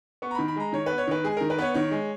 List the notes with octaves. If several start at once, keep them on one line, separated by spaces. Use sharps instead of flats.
B3 C#6
A#5
D#3 B5
B5
G#3 A#5
D#3 C#5
B3 B4
C#5
D#3 B4
G#3 G#4
D#3 A#4
B4
B3 C#5
D#3 C#5
G#3